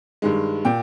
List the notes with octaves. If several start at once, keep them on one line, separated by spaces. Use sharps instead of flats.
G2 D#3 G#3
A#2 G5